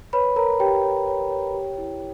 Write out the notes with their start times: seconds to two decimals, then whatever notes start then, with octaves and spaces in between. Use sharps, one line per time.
0.13 B4 C#5 B5
0.36 A#4 C#5 A#5
0.60 G4 C#5 G5
0.83 C#5
1.07 C#5
1.31 C#5
1.54 G4
1.78 E4